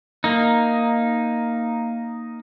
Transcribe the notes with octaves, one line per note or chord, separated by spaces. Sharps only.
A#3 D#4